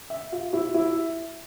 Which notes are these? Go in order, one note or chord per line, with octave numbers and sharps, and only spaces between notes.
E5
F4
E4
E4